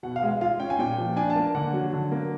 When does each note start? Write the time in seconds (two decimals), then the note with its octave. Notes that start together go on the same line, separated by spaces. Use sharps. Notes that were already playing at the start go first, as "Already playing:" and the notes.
0.03 B2 F#5
0.16 F5
0.23 G#3
0.28 F5
0.41 F4 F5
0.60 C#4 G5
0.70 G#5
0.79 A#2 G5
0.98 F3
1.16 D4 G#5
1.30 A5
1.36 A#3
1.55 D3 F#5
1.73 F#3
1.93 D3
2.12 A#3